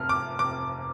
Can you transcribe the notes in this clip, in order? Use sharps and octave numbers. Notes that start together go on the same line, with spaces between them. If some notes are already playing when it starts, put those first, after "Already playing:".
Already playing: F1 F2 F6
D6
F1 D6